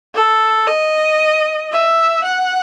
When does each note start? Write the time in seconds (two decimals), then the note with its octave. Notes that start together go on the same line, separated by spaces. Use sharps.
0.15 A4
0.67 D#5
1.72 E5
2.24 F#5